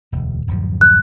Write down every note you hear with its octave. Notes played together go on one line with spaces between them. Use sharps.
E1 D2
D1 F#2 F3
F#6